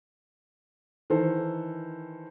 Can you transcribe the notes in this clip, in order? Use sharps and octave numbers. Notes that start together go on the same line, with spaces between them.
D#3 E3 A4 C5